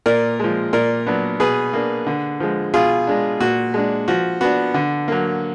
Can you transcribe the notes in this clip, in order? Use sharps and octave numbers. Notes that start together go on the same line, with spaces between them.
A#2 A#4 D5
F3 G#3
A#2 A#4 D5
F#3 B3 D4
B2 G#4 B4
A#3 D4
D3
F3 G#3
B2 F4 G#4
G#3 D4
A#2 F#4
G#3 D4
F3 F#4
B3 D4 F#4
D3
F#3 A#3